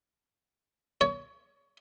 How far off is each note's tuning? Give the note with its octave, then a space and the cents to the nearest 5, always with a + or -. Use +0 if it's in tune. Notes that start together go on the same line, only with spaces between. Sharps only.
C#5 +25